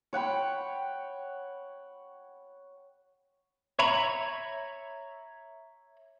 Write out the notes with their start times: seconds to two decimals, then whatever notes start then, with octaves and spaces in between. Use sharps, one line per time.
0.13 C#5 F#5 G5 B5
3.79 C#5 E5 A#5 B5